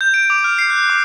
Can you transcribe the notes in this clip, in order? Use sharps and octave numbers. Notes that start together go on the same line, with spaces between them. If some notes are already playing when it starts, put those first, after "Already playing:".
G6
D7
D6
F6
C7
F#6
D6